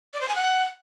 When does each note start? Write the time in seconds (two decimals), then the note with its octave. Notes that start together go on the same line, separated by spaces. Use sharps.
0.13 D5
0.21 C5
0.28 G#5
0.35 F#5